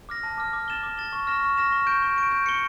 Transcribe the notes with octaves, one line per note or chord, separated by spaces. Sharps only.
D6 F6 A#6
A5
D6 F6 A#6
D6
A6 E7 G7
D6
A6 E7 G7
C#6
F6 A#6 E7
C#6
F6 A#6 E7
C#6
G6 D7
C#6
G6 D7
G6
C#7 G7